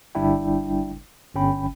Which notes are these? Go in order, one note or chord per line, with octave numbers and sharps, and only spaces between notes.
G1 G3 D4 E4 G5
G1 C#4 G5 B5